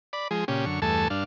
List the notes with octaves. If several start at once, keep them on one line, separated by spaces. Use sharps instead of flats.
D5 B5
F3 G#3 G#4
A#2 C#3 C#4 G4
F#2 D3 C#6
E2 G2 A3 A4 G#5 A5
G2 D4 F5